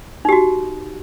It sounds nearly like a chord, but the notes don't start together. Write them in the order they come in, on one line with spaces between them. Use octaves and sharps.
D#4 G4 F#4